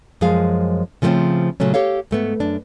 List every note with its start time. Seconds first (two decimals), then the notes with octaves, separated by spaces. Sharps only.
0.21 F#2 F3 G#3 G#4 F5
1.02 C#3 F3 A3 A#3 C4 C#4
1.60 A#2 C#3 F#3 A3 C#4
1.74 G4 A4 C#5 F5
2.11 G#2 A3 B3
2.40 F#2 D4